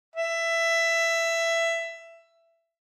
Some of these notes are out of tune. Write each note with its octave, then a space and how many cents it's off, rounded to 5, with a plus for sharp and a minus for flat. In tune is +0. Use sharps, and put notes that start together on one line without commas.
E5 +15